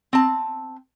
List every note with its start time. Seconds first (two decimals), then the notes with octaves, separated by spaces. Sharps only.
0.13 C4 A5